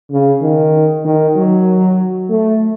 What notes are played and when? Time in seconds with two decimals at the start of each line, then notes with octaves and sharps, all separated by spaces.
0.11 C#3
0.42 D#3
1.05 D#3
1.36 F#3
2.30 A3